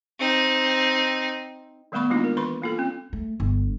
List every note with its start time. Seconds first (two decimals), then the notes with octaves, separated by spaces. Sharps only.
0.19 C4 D#4
1.92 D#3 G3 A3 B3 B5 C#6
2.10 G#3 A#3 D4 D#4 F4 F#4
2.24 A#4
2.37 E3 B4 C6 C#6
2.62 A#3 F4 A4
2.78 C4 C#4
3.13 A3
3.40 G1